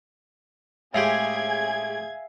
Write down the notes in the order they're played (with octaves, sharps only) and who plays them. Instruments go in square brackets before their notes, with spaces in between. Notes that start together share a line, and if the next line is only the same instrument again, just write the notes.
[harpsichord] A2 G#3 G4 [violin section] G#4 G#6 [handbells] E5 F5